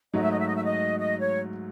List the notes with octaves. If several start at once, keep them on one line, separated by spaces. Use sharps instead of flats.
G#2 F#3 A3 D#5
E5
D#5
E5
D#5
E5
D#5
D#5
C#5